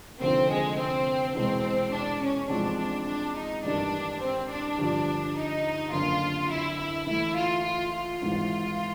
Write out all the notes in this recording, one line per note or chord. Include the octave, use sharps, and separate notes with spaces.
F1 D#2 D3 F3 C4
G#3
C4
E2 B2 G#3 B3 C4
D4
C#4
A1 G#2 F3 G#3 C4 D4
D4
D4
D#4
A1 G2 D#3 D4
C4
D4
G2 D3 F3
D#4
F#1 F2 D3 F4
E4
E4
A2 E3 A3 E4
F4
F4
F4
G#1 G#2 E3